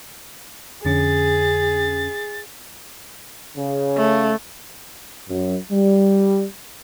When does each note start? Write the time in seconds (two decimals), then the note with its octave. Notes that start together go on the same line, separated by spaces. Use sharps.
0.85 F2 D3 C#4 G#4 A6
3.56 C#3
3.97 A3
5.29 F#2
5.71 G3